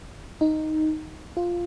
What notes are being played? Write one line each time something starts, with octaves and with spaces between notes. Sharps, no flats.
D#4
F4